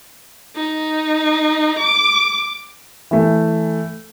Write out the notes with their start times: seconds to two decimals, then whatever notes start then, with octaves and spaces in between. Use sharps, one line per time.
0.55 D#4
1.79 D6
3.11 E3 A3